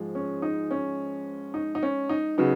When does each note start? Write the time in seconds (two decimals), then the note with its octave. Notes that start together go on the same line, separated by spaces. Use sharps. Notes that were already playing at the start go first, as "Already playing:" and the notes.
Already playing: G#2 F3 G#3
0.15 C#4
0.42 D#4
0.71 C#4
1.54 D#4
1.75 D#4
1.83 C#4
2.09 D#4
2.38 C#3 F#3 B3 D#4